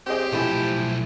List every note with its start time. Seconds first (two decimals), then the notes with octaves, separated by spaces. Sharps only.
0.06 C4 G4 G#4 D#5
0.32 B1 F3 A3 E4 A4 G#5 A5